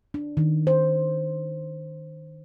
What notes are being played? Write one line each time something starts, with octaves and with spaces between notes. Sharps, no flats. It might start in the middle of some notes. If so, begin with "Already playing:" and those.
D4
D#3
C5